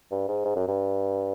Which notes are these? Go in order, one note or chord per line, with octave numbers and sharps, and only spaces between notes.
G2
G#2
G#2
F#2
G2